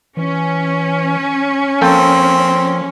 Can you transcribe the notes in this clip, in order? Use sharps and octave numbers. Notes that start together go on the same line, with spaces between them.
E3 C#4
F3 A#3 C4 A4 G5